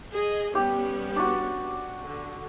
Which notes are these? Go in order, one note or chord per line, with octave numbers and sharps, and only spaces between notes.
G#4 D#5
G3 B3 C#4 G4
D4 F#4
D3